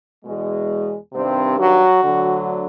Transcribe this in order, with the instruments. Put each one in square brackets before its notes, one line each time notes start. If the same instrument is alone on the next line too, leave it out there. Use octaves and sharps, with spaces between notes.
[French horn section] E2 B2 G#3
G2 C3 D#3 G3 C4
F#3 F#4
D2 D3 F#3